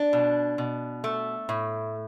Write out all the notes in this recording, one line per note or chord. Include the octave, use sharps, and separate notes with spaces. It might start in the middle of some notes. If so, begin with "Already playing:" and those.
Already playing: D4
B2
B2
A3
A2